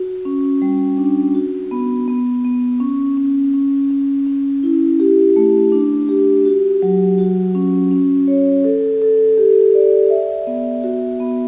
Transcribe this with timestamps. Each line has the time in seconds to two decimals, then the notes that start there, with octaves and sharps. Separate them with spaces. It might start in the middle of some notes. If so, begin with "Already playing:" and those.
Already playing: F#4
0.25 C#4
0.62 G3
0.98 D4
1.34 F#4
1.71 B3
2.08 B3
2.45 B3
2.80 C#4
3.17 C#4
3.54 C#4
3.91 C#4
4.27 C#4
4.63 E4
5.00 G4
5.36 A3
5.72 D4
6.09 G4
6.45 F#4
6.82 F#3
7.18 F#4
7.55 C#4
7.91 C#4
8.28 C#5
8.64 A4
9.02 A4
9.38 G4
9.75 D5
10.10 E5
10.47 B3
10.84 F#4
11.20 B3